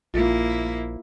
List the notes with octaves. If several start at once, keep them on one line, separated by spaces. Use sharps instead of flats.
A#1 A#3 E4 F4